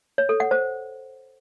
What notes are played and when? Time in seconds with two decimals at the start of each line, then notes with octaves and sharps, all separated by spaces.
0.18 C#5
0.29 A4
0.40 F#5
0.51 C5